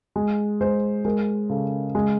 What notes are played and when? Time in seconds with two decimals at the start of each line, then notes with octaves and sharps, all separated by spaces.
0.16 G#3
0.61 G#3 C5
1.05 G#3 A#4
1.49 C#3 A4
1.95 G#3